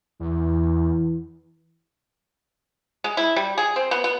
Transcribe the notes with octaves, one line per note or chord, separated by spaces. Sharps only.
E2 E3
G#3
E4
G3
G#4
C4
B3
B3